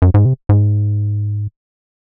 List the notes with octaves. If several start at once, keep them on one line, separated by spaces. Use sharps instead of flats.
F#2
G#2
C3
G#2